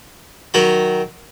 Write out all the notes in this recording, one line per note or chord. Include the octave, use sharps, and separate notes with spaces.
D#3 F#3 B5